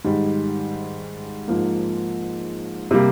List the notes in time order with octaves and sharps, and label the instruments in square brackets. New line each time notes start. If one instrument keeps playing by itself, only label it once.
[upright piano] G#2 D#3 G3
G#2 F3 A#3
C3 G3 A#3